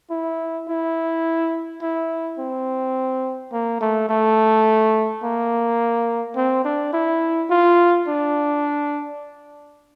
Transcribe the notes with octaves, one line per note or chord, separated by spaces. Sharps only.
E4
E4
E4
C4
A#3
A3
A3
A#3
C4
D4
E4
F4
D4